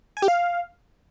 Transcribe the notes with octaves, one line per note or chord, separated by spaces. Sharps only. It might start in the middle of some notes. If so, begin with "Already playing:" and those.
G#5
G4
F5